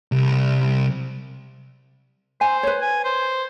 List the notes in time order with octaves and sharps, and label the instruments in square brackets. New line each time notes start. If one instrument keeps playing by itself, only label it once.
[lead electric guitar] C2
[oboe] C5 [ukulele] G#5
[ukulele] B4 C#5
[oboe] G#5
C5